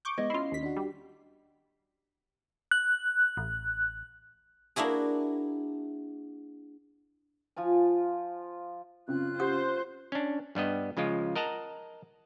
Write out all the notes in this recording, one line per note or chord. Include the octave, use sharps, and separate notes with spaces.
C#6 D6 G6
G#3 B3 D#5 G#6
C#4 E4 F4 C7
D#2 B6
D4 F#4
G3
F#6
A1
A#3 D4 E4 F#4 G#4
F3 F4 G#5
F#1 C#3 C4 F4 F#6
G4 C5 F#5 D#6
C#4 D4
G2 G3 B3 D#5
C#3 F3 G#3 F4
A#4 D#5 F#5 A5 A#5